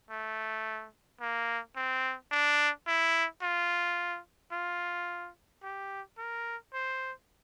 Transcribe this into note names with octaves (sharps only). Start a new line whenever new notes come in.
A3
A#3
C4
D4
E4
F4
F4
G4
A#4
C5